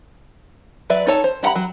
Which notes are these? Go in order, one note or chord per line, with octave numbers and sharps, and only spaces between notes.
F#3 B4 D5 E5
D#4 A4 C#5 A5
C5
D4 G4 F#5 A#5 B5
F#3